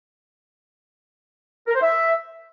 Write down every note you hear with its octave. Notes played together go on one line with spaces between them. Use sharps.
A#4
C5
E5